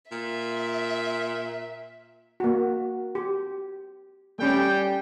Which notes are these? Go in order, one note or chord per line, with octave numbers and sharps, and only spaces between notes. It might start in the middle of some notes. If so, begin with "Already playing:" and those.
A#2 E5
A#3 F#4
G4
G3 A3 C#4 G5